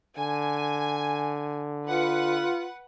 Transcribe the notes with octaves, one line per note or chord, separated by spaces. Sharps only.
D3 G#5
F4 B4 F#5